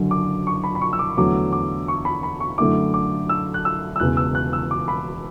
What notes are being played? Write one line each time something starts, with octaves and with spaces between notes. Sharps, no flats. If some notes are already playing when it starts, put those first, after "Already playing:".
Already playing: F#1 F#2 D3
D6
C#6
B5
B5
C#6
E6
D6
E2 D3 F#3 A3 D6
D6
C#6
B5
B5
C#6
F#2 D3 A3 E4 D6
D6
E6
F#6
E6
E6
E1 E2 C#3 F#6
E6
F#6
E6
D6
B5